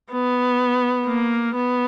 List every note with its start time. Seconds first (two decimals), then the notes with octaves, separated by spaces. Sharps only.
0.12 B3
1.07 A#3
1.55 B3